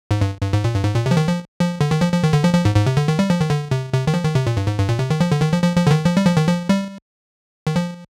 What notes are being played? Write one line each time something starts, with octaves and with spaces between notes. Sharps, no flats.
G#2
G2
G2
G#2
A#2
G2
G#2
A#2
C3
F3
D#3
F3
F3
D3
D#3
F3
F3
D#3
D3
F3
F3
G#2
G#2
C3
D3
D#3
G3
F3
D#3
D3
C3
C3
D#3
F3
D#3
C3
A#2
G2
G#2
G2
A#2
C3
D#3
F3
D3
D#3
F3
F3
F3
D3
D#3
F3
G3
F3
D#3
F3
G3
D#3
F3